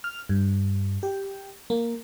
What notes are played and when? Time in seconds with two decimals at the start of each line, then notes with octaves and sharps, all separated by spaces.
0.04 F6
0.29 G2
1.03 G4
1.70 A#3